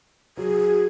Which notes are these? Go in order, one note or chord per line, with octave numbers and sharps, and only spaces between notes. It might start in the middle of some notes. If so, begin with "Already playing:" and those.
F#3 G#4